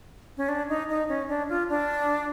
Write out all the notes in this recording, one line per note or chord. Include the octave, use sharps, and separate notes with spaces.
C#4
D4
D#4
D#4
C#4
D4
F4
D4